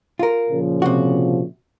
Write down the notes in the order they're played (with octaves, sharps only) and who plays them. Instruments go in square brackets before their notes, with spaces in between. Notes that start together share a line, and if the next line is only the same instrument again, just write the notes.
[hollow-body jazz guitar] F4 A#4
[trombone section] A#2 C#3 F3
[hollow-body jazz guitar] C3 F#4